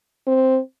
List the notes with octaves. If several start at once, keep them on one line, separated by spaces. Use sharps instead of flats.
C4